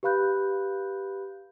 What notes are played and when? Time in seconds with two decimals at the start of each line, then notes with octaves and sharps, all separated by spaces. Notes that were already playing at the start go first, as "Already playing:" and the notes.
0.03 G4 B4 F5 B5 F#6 G6